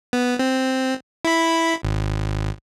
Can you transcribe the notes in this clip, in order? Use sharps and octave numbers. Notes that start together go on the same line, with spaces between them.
B3
C4
E4 B5
G#1